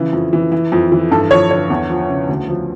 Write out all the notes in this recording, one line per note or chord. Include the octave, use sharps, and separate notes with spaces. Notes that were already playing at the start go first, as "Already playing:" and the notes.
Already playing: C#3 E3
F2
E3
E3
F2
E3
G2 A4
F3 C#5
D3 C#5
E2
F3
C#3
D2
F3